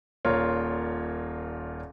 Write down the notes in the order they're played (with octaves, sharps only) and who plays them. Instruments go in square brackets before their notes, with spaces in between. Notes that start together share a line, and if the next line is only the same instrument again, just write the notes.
[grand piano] D#1 A#2 F4 A#4 C#5